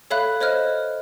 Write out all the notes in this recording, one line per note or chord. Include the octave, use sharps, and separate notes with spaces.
A4 C#5 E5 F5 B5 F#6
C5 C#5 D#5 F6 F#6